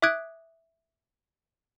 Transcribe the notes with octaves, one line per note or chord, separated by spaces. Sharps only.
E5 D6 D#6 F#6 G#6 D7